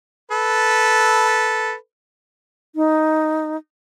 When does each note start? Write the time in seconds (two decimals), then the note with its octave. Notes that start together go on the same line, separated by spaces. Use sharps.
0.31 A4 B4
2.76 D#4